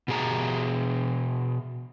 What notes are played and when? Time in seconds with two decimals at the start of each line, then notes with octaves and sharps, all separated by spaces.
0.08 B2 G#4 A#5